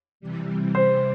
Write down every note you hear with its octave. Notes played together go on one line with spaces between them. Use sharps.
C3 E3 G3
C5